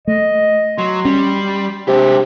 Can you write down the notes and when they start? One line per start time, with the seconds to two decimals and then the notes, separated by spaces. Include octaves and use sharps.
0.07 A3 D#5
0.78 F#3 C6
1.05 G3 C#4
1.88 C3 G#3 D4 G4